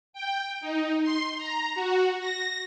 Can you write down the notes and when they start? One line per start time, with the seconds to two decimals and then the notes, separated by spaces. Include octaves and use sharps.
0.13 G5
0.61 D#4
1.03 C6
1.37 A#5
1.75 F#4
2.20 A#6